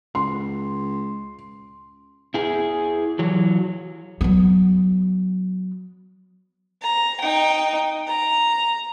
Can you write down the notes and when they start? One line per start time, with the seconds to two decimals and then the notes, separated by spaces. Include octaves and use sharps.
0.15 C#2 C6
2.34 E4 G#4
3.19 E3 F#3
4.21 F#3 B3
6.82 A#5
7.20 D#4 G5
8.07 A#5